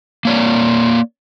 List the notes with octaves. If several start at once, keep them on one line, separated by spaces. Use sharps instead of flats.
A#3 C#5 D5